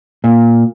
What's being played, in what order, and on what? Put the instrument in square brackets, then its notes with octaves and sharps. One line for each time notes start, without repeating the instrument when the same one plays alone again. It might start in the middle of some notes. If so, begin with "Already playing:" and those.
[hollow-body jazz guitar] A#2